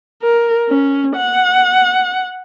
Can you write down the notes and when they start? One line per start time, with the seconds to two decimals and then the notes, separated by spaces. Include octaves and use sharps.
0.22 A#4
0.69 C#4
1.16 F#5